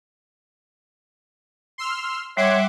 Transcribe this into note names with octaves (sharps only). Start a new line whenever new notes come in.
C6 E6 F6
G3 C#5 E5 F#5 C6 D6